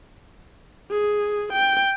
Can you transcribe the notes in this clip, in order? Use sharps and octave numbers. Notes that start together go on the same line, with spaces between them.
G#4
G5